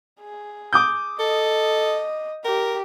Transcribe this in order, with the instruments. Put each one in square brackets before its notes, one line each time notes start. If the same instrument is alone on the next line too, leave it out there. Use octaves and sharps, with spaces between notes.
[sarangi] G#4
[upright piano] D6 D#6 G6
[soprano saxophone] A4 [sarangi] D#5
[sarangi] G4 [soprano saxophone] A#4